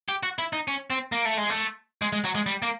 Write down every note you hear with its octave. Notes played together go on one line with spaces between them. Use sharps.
G4
F#4
E4
D#4
C#4
C4
A#3
A3
G#3
A3
G#3
G#3
F#3
G#3
G3
A#3